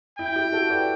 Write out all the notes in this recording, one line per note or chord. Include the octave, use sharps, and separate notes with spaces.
E4 G5
E4 G4
F#4 A4
B4 D5